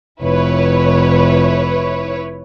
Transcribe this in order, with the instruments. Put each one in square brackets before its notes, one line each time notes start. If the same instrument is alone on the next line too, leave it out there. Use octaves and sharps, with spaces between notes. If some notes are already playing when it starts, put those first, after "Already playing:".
[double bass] F1 [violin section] E4 B4 C#5